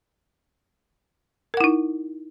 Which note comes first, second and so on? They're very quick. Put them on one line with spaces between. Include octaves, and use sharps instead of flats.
A#4 F#5 E4 D#4